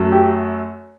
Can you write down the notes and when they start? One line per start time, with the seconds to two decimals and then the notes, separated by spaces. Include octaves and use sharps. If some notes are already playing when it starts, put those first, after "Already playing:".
Already playing: F#2 F#3 A3
0.12 G4